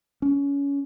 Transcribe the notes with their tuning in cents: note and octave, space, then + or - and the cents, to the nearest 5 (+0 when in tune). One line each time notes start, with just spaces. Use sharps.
C#4 +25